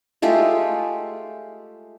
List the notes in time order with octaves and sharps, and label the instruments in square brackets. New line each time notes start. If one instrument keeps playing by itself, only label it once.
[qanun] G#3 A3 F4 G4